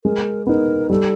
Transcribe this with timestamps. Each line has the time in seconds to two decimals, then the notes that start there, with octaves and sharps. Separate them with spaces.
0.05 G#3 A#4
0.47 B3 D#4 A#4
0.90 G3 A4